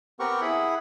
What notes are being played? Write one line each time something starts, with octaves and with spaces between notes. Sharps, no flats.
B3 C4 G4 A#4 F#5 C#6
E4 G#4 F#5 B5